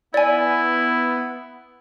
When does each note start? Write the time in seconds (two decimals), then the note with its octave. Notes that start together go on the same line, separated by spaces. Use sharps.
0.14 B3 E4 D5 G#5